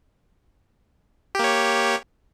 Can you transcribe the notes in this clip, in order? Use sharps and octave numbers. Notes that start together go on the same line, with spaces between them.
A#3 G4 C#5